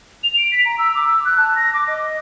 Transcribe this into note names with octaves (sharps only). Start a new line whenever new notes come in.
F7
D7
B6
A#5
E6
D6
E6
F#6
A5
A#6
D6
D#5